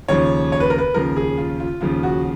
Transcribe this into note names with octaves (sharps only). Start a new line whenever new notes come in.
D#2 C#3 F3 C#5
C#5
B4
A#4
B4
D#2 C#3 F3 A#4
G#4
F4
F4
D#2 C#3 F3 F4
F#4